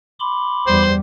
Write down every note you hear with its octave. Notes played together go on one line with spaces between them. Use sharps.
B5 C6 D6
E2 G3 C5